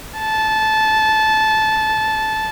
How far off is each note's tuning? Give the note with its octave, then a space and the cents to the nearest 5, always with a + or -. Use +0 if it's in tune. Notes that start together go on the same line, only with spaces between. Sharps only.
A5 -15